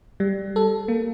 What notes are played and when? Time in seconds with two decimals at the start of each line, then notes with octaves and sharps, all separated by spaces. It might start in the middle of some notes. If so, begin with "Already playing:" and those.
0.20 G3
0.56 A4
0.88 A#3